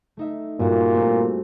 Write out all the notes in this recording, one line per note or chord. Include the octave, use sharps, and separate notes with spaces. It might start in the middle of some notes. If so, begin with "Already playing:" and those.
A3 D#4 E5
G2 A#2 F#4 D5
A3 C4